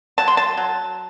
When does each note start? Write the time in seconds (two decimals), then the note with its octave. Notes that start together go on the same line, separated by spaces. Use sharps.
0.18 F#3 A5
0.28 C6
0.37 A5
0.57 F#3